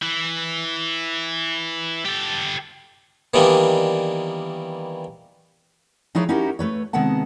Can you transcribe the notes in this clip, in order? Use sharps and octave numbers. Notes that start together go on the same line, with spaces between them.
E3
G4 A4
D#3 E3 G3 A#3 B3 D4
F3 D#4 E4 G#4 B4 C#5
C#4 D#4 E4 F#4 G4 A#4
A3 B4 C#5
C3 D#3 G#3 B3 F#5 A5